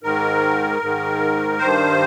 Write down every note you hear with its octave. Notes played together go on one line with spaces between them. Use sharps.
G#2 D#3 A#4
G#2 D#3
G2 D#3 C5